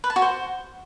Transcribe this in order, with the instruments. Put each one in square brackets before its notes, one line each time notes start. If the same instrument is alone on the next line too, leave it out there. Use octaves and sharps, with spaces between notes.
[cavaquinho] B4
A5
F#4
C5